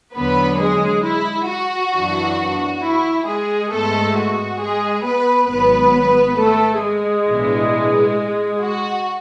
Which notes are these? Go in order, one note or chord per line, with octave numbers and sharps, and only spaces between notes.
E2 D3 F#3 B3 B4
G#3 G#4
E4
F#4
F#2 E3 B3 D4
E4
G#3 G#4
G#2 G#3 A3 B3 A4
F#4
G#3 G#4
B3 B4
G#1 G#2 F#3 B3 B4
A3 A4
G#3 G#4
B1 A2 E3 B3 D4
F#4